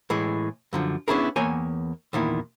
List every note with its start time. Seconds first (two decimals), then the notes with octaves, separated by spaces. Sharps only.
0.10 A2 E3 G#3
0.73 F#2 D3 F3
1.08 B3 C#4 D4 E4 G#4 A#4
1.36 E2 A#3 C#5 G5 G#5
2.13 E2 A#2 D#3 E4